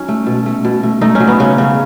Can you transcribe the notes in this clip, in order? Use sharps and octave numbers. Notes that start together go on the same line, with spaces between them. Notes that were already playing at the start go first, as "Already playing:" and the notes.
Already playing: F#3 C#4 D#4
A3
B2
A3
B2
A3
A3 D#4
C#4
F#3
B3
C#3 C#4
C#3 C#4